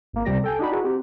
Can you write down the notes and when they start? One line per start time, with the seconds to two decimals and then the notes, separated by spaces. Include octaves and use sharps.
0.13 G#1 A#3
0.25 C#2 C3 G3 G4 D5 A#6
0.44 A4 G5 G#5
0.59 D4 D#4 F#4 B5
0.71 D#4 E4 F#4 G#4 B4
0.84 C4 G4